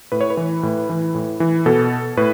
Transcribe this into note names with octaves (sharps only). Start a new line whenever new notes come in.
A2 B4
C#5
B4
E3
A2
E3
A2
E3
B2 A4
A2 B4